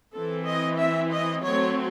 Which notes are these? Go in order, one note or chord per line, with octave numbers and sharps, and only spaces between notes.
E3 C4 A4
D#5
E5
D#5
F#3 A3 C4 C#5